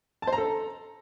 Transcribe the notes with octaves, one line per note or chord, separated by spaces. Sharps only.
A5
C5
A#5
A4